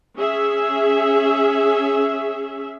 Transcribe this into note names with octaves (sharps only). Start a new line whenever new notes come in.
C#4 G#4 E5